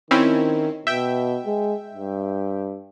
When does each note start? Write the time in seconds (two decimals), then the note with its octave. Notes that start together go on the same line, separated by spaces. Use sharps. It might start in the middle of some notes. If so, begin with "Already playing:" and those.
0.11 D#3 C4 C#4 E4
0.87 B2 E5 G5
1.46 G#3
1.94 G2